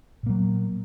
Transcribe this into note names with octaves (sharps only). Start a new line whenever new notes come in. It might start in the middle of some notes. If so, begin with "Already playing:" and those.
A#2 F#3 A#3